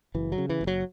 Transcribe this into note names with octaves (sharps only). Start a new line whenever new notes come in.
F#1 E3
F#3
C#3
E3
F#1
F#3